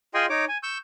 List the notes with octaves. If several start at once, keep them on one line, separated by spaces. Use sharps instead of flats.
F4 G#4 D#5 G5 G#5 C6
D#4 C#5 D6
G#5
C#6 E6 G6